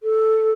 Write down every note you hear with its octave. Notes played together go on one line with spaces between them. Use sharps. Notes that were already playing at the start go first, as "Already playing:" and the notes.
A4